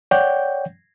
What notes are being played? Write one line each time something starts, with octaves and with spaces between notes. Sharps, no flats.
C#5 D5 F#5 G5 G6